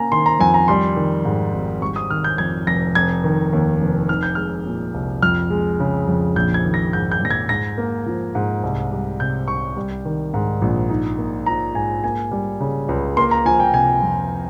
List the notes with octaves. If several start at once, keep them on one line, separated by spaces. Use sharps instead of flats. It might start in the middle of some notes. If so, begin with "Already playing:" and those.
Already playing: A#3 C#4 G#5 A#5
D#3 C6
A#5
F2 G#5
A#5
G3 C6
D#3
G#2
G#1
G3 C#6
D#6
D#3 F6
G6
F2 G#6
F1 A#6
F1 G#6
D#3
D#2
F1
D#4 F6
G6
G#3 F6
A#2
C2
F2 F6
G#3
C#3
F2
A#1 G6
G#6
D#3
A#6
G#2 G6
G6
A#1 A#6
G#6
G#2 A#6
A#3
F3
G#2
C2
G3
C3 G6
C2 C#6
G3
D#3
G#2
A#1
D#4
A#3
F3 A#5
G#2 G#5
A#3 G#5
G3
C#3
C#2
A#3 C6
A#5
F3 G#5
G5
C3 G#5
F2